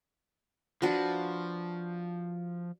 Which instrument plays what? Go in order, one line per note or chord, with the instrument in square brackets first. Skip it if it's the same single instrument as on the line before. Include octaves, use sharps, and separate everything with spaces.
[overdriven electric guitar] F3 [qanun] D4 F#4 B4